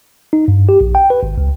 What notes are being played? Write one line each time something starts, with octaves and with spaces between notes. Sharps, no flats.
D#4
G2
G4
A#1
G5
B4
G#1
C#2